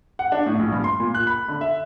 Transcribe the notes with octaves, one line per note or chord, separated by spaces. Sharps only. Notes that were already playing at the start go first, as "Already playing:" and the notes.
F#5
D4
A2
A#1
G2
C6
A#2
F#6
B5
D3
E5